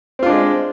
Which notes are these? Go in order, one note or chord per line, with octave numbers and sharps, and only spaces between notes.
G#3 C4 D4 F4